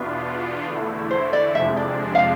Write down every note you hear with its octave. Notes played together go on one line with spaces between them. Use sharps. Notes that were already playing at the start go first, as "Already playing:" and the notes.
Already playing: E2 B2 B3 D4 F4 E5
E2 D3 A3 E4
C5
D5
F2 C3 F3 G#3 D4 E5
D5
F5